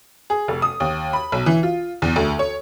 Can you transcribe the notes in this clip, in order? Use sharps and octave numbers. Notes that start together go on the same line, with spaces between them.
G#4
F1
D#6
D#2
B5
B1
E3
F4
E2
D2
C#5